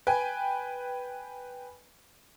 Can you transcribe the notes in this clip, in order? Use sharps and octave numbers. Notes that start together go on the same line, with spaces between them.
B4 G5 G#5